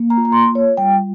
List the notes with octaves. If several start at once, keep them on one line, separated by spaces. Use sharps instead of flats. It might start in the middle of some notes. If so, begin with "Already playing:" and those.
Already playing: A#3
A#5
F4
A#5
C6
F4
C#5
G3 G5